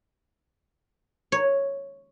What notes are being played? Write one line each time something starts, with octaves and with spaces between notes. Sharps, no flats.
C#5